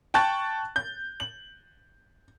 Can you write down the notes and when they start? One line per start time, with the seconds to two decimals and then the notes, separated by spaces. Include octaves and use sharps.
0.14 G5 A5 C#6 F#6 A6
0.76 G6
1.20 F#7